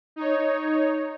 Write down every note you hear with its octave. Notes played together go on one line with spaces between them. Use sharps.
D#4 C#5